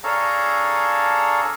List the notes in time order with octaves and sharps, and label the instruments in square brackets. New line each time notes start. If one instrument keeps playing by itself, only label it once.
[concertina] D4 G#4 A4 C#5 F5 A#5